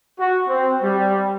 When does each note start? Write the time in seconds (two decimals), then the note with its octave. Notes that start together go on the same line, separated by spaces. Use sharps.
0.19 F#4
0.48 C4
0.82 G3